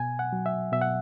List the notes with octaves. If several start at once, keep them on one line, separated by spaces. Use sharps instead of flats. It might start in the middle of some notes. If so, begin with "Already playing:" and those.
Already playing: B2 G#5
F#5
F#3
E5
B2 E5
F#5